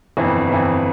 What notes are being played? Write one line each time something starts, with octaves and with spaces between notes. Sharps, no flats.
G1 F2 E3
G1 F2 E3